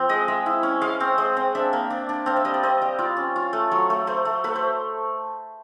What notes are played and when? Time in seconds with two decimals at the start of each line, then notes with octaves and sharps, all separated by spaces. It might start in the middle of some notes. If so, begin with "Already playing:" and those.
Already playing: F3 C4
0.09 G#3 D#5
0.28 G#3 E5
0.46 E4
0.63 C#4
0.81 G#3 F5
1.00 C4
1.18 G#3
1.37 C4
1.55 D4 E5
1.73 A#3
1.90 D4
2.09 D4
2.26 C4 F5
2.36 E5
2.45 G3 D#5
2.54 D5
2.63 C4 D#5
2.82 G3
2.99 F4 D5
3.17 C#4
3.36 F4
3.53 A3
3.71 F#3 C#5
3.90 A3
4.07 A3 C5
4.25 A3
4.44 A3 B4
4.55 C5